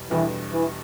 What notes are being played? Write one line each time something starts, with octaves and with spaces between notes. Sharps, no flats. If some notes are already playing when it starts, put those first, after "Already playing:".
Already playing: E2 B2 G3
E2 B2 E3 G3 D4 A4
E3